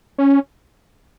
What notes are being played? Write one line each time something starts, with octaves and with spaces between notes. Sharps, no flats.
C#4